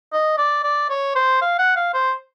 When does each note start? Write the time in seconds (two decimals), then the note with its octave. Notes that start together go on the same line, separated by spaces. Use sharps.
0.13 D#5
0.38 D5
0.64 D5
0.90 C#5
1.16 C5
1.41 F5
1.58 F#5
1.76 F5
1.94 C5